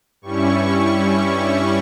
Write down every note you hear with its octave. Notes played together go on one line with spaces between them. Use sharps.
G2 G3 C#4 E4 C#6
C#6